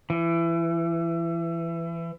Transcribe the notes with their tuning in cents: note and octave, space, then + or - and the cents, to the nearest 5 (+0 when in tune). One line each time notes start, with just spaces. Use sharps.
E3 +25